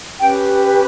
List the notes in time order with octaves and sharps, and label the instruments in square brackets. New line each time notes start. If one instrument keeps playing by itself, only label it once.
[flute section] C#4 G4 B4 G5